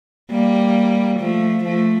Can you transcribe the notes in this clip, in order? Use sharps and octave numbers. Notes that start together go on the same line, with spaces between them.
G3 A#3
F3 A3
F3 A3